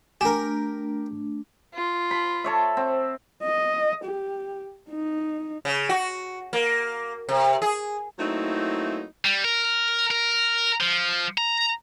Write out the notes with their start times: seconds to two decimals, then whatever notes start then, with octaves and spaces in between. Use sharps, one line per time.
0.21 A3 D4 G4 A#4 G#5
1.74 F4
2.11 B5
2.44 A4 C#5 E5
2.77 C4
3.43 D#5
4.04 G4
4.90 D#4
5.65 C#3
5.89 F#4
6.53 A#3
7.29 C3
7.62 G#4
8.18 F#3 A3 A#3 C4 D#4 E4
9.25 G3
9.44 A#4
10.11 A#4
10.81 F3
11.38 A#5